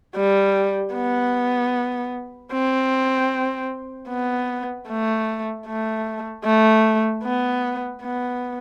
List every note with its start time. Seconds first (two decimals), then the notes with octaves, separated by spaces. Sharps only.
0.15 G3
0.95 B3
2.52 C4
4.09 B3
4.88 A3
5.67 A3
6.45 A3
7.24 B3
8.02 B3